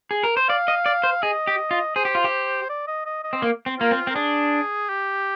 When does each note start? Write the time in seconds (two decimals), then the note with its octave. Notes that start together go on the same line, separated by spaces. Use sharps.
0.11 G#4
0.23 A#4
0.37 C5
0.49 D5 F5
0.68 D#5
0.86 D5
1.04 C5
1.23 G#4 D#5
1.47 G4
1.71 F4
1.96 G#4 C5
2.05 G4
2.15 F4
2.24 G4
2.69 D5
2.87 D#5
3.06 D#5
3.24 D#5
3.33 C4
3.42 A#3
3.66 C4
3.79 A#3 F4
3.91 C4
4.07 C4 A#4
4.15 D4 G#4
4.89 G4